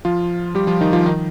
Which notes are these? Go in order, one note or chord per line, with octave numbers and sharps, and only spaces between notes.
F3 F4
G3 G4
F3 F4
D#3 D#4
F3 F4
D#3 D#4